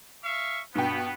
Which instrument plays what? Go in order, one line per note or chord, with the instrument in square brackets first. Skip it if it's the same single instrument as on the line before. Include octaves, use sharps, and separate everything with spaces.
[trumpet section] E5 F5 C#6
[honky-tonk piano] G2 B2 G5 [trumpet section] B3